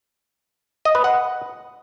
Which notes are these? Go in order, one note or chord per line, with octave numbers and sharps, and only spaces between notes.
D#5
B4
F#5